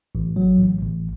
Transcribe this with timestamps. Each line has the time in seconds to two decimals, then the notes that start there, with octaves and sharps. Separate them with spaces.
0.15 A1
0.36 F#3
0.59 A1
0.81 A1